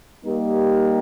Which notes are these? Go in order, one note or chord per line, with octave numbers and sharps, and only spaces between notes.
G3 A#3 D#4 G4 A#4